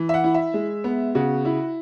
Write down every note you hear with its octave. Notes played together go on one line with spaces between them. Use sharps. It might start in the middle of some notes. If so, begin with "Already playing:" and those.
Already playing: E3
E5
F#5
E4
E5
G#3
B3
C#3 F#4
E4